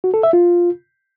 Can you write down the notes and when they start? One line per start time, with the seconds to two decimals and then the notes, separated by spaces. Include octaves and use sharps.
0.04 F#4
0.14 A4
0.23 E5
0.33 F4